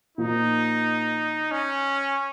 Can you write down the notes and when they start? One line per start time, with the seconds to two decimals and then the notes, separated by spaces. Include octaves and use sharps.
0.17 A#2 F3 A#3 D#4 F4
1.51 C#4